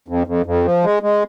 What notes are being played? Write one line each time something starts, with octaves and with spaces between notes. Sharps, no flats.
F2
F2
F2
F3
G#3
G#3